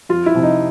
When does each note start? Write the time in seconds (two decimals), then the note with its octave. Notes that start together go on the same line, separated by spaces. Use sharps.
0.09 F2 F4
0.26 E4
0.35 C3 F3
0.43 D#4